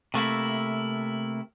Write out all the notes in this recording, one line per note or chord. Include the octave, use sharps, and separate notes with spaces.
C3 A3 A#3 E4